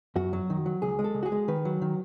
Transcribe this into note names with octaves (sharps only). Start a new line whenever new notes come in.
F#2 F#4
F#3
D#3
F#3
C#2 G#4
G#3
A4
C#2
F#4
G#4
G#3
D#3 B4
F#3
D#3